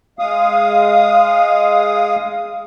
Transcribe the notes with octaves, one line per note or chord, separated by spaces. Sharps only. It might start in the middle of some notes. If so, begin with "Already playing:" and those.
G#3 F5 D#6